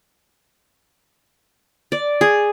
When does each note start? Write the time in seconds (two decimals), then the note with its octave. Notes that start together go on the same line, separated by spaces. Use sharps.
1.92 D5
2.21 G#4